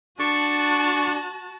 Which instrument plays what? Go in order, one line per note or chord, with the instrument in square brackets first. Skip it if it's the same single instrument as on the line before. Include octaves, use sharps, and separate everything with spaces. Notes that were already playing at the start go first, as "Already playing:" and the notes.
[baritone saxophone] D4 [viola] F#4 A5 [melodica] C#6